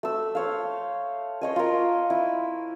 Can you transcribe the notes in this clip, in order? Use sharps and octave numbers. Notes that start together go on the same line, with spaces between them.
A3 E6
C5 C#5 F5
C5 C#5 D#5 G#5
F4 A#4
E4